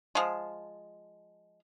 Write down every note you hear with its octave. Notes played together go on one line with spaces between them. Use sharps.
F3 G#3